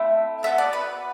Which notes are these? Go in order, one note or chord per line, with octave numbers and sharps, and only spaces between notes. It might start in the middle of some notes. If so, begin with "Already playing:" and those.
Already playing: A3 C4 E4
B3 F#4 A4 E5
D5
B4